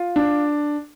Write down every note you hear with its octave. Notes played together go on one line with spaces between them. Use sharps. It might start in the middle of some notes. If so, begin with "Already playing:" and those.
Already playing: F4
D4